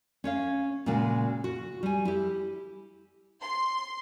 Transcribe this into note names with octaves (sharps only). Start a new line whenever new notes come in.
C#4 C#5 F5
A#2 C#3 G#3 F#4
F#4
G3 G#5
E4 G4
C6